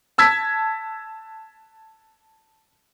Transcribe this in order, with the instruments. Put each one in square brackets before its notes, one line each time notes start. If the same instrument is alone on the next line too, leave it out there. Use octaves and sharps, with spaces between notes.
[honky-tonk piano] A5 E6 G#6 B6